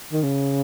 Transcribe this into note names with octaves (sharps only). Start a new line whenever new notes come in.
D#3
C#3